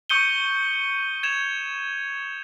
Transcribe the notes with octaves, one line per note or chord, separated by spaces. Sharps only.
C#6 D#6 G6 C#7 D#7 G7
G#6 E7 F7